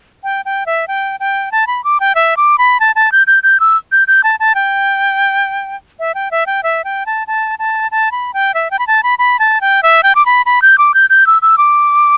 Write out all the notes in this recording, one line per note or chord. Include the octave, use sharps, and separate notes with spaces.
G5
G5
E5
G5
G5
A5
B5
D6
G5
E5
D6
B5
A5
A5
G6
G6
G6
E6
G6
G6
A5
A5
G5
E5
G5
E5
G5
E5
G5
A5
A5
A5
A5
B5
G5
E5
G5
B5
A5
B5
B5
A5
G5
E5
G5
D6
B5
B5
G6
D6
G6
G6
E6
E6
D6